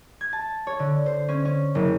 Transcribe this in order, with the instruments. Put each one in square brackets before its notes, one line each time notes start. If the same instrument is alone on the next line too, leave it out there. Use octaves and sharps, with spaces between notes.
[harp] G#6
A5
C#5
D3
C5
C#4
C#4
F#1